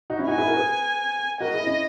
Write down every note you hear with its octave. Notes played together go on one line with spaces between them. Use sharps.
D#4 F#4
C#4 E4
D#4 F#4 G#5
E4 G#4
F#4 A#4
G#4 B4
F#4 A#4 D#5
E4 G#4
C#4 E4